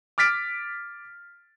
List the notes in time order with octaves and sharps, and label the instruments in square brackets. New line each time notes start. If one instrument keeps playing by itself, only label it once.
[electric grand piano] D6 F6 A6 B6 D7